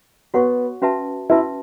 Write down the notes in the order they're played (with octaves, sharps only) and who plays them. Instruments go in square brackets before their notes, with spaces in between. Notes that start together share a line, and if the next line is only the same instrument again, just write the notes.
[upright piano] B3 [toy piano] F#4 C#5 F#5 C#6
[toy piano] C#4 F#4 B4 E5 A5
[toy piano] C#4 F#4 B4 E5 A5 [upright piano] E4